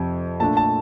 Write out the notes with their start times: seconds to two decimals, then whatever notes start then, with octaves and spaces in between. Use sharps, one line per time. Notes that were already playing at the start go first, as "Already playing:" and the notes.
Already playing: F2 C3 F3
0.40 A#2 A3 D4 A5
0.57 A5